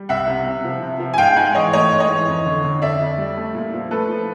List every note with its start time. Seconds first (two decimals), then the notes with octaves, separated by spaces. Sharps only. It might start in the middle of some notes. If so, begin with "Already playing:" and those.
Already playing: G3
0.09 C2 E5 F#5
0.28 C3
0.46 C3
0.64 F3
0.82 C3
1.00 F3
1.14 G#5
1.18 G#2 F5 G5
1.36 G#2 F#5 G#5
1.55 E3 C#5 D#5
1.73 A3 C#5 D#5
1.92 G#2
2.00 C#5 D#5
2.10 E3
2.28 F2
2.46 D3
2.64 D3
2.82 F2 D5 E5
3.00 F2
3.18 G3
3.37 A3
3.55 A#2
3.74 F3
3.91 A3 A4 B4
4.09 F3